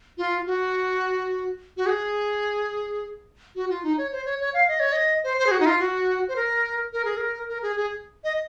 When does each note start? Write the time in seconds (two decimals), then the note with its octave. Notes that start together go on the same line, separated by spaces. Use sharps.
0.18 F4
0.46 F#4
1.77 F#4
1.86 G#4
3.55 F#4
3.70 F4
3.83 D#4
3.98 C#5
4.12 C5
4.25 C#5
4.40 C#5
4.54 F5
4.68 D#5
4.80 C#5
4.92 D#5
5.24 C5
5.38 C5
5.47 G#4
5.51 F#4
5.60 D#4
5.66 F4
5.80 F#4
6.28 C5
6.36 A#4
6.93 A#4
7.05 G#4
7.17 A#4
7.48 A#4
7.62 G#4
7.76 G#4
8.24 D#5